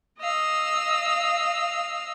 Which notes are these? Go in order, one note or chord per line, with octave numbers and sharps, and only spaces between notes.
D#5 F5 E6